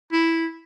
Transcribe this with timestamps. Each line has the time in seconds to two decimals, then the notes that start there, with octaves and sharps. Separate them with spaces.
0.12 E4